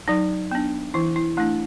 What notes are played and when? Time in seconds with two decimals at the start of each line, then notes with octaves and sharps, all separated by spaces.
0.08 F#3 D#4
0.51 B3 D4
0.94 E3 E4
1.16 E4
1.37 A3 D4 E4